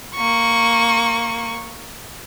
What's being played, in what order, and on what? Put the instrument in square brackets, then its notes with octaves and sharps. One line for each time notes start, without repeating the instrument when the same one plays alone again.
[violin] A#3 C#6